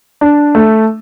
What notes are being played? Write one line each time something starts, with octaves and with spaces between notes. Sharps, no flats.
D4
A3